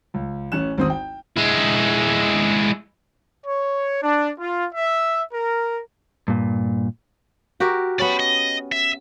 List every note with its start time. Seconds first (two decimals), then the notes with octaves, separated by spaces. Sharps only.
0.14 C#2
0.52 A1 C#4 F#6 E7
0.78 G#1 C4 D#6
0.90 G5
1.37 G#3 E4
3.46 C#5
4.02 D4
4.39 F4
4.74 E5
5.32 A#4
6.28 G2 A#2
7.60 F#4 G4 A#4
7.99 B3 C#4 D5 B5
8.20 D#5
8.72 E5